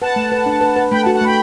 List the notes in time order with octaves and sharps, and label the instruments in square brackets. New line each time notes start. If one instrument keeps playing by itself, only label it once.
[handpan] B4 [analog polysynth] F#5 A5
[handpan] A3
B4
D4
B4
B4
[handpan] A3 [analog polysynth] G5 B5
[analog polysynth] F#5 A5
[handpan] F#4
[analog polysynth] F#5 A5
[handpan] A3 [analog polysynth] G5 B5